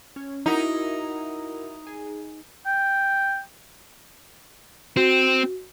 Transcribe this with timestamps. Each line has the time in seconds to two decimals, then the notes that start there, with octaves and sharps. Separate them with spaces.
0.16 C#4
0.46 D#4 E4 F#4 A#4
1.87 G#4
2.66 G5
4.97 C4 F#4